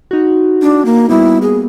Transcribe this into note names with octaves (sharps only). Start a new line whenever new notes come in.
D#4 F#4
D4
A#3
G3 A#3 B3 E4
G#4